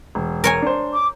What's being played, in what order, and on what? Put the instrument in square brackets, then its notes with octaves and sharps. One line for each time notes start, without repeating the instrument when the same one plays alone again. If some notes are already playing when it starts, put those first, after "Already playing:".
[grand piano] E1
[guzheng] A#4 C#5 G#5
[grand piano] D4 C5
[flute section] D6